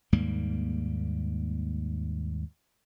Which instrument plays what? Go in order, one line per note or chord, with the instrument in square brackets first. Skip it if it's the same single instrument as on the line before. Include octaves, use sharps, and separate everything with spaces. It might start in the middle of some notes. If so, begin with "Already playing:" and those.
[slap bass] D#2 G#2 G3 A#3